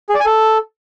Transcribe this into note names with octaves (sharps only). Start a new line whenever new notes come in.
G#4
D5
G#5
A4